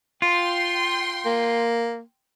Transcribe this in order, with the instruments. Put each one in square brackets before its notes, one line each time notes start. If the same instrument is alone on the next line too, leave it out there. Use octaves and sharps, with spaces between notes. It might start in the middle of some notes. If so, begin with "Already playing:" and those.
[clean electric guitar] F4 [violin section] G5 C6
[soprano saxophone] A#3